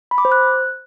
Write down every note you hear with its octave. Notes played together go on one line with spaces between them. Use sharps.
B5
D6
C5
F#6